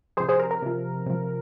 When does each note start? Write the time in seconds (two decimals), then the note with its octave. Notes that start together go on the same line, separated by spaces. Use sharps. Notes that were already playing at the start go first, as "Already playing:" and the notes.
0.17 C3 F3 G#4 C5
0.29 G#4 C5
0.39 A#4
0.51 A#4
0.62 C3 F3
1.06 C3 F3